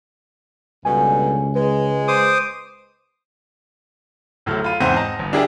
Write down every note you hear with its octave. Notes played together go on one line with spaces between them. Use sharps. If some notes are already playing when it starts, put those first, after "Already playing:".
C#2 G2 B2 D3 G#5
G#3 B4
C5 D6 D#6
D1 A2 F#3 A4 F6
F4 B5 D#7
E2 G#2 C4 C5 E5 D#7
D#5 A5 A#5
G1
D4 E4 G4 G#4 A#4